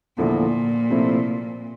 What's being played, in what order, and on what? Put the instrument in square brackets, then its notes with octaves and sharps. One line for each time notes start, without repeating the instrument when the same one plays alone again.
[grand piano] E2 D3 F3 A3 E4 [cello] A#2
[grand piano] C3 F3 A3 C4 E4